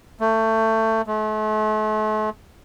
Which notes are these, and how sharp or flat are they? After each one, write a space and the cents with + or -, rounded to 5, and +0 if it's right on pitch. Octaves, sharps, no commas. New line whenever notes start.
A3 +20
A3 -40